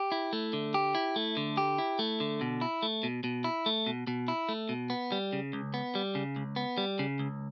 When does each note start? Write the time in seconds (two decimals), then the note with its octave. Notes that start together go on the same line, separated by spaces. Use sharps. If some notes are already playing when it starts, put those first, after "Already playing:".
Already playing: G4
0.12 E4
0.33 A3
0.53 D3
0.74 G4
0.95 E4
1.16 A3
1.37 D3
1.57 G4
1.78 E4
1.99 A3
2.20 D3
2.41 B2
2.61 E4
2.83 A3
3.03 B2
3.24 B2
3.44 E4
3.66 A3
3.87 B2
4.07 B2
4.28 E4
4.49 A3
4.69 B2
4.90 B3
5.12 G3
5.33 C#3
5.53 C#2
5.74 B3
5.95 G3
6.15 C#3
6.36 C#2
6.56 B3
6.78 G3
6.99 C#3
7.19 C#2